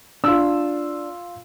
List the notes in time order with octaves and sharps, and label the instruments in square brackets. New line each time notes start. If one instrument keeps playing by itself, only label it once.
[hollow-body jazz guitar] D4 [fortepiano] F4 E6